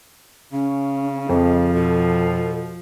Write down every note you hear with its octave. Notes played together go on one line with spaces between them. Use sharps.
C#3 C#4
F2 F3 D#5
B2 A4